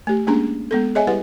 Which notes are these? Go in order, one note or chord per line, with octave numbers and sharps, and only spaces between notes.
A3 G4
G#3 A#3 C#4 D4 G#4 A#5
G#3 B3 A4
G#4 C#5 D#5 E5 G#5
G3 E4 G4 B4 F#5